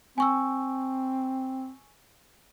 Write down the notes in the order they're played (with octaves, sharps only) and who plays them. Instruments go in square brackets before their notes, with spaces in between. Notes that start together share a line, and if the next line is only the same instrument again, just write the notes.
[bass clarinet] C4 [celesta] G#5 C#6 E6